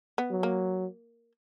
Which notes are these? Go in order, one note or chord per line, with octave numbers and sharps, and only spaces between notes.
B3
F#3
A#3